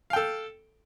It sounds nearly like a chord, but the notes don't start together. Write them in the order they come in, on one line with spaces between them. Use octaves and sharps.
F5 G5 A4